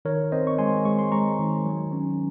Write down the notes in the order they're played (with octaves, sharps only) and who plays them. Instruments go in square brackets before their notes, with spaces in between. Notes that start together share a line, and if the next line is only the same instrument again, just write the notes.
[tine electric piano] D#3 A#4 C#5
C4 C5 D#5
C#6
G#3 G#5 C6
G#3 C#6
C6
G#3 A#5 C#6
D#3
F#3
C#4